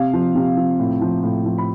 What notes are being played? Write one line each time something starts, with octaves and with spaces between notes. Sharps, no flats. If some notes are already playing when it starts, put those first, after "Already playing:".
Already playing: C3 F5
F3
C3
F3
A2
F3
A2
F3
B5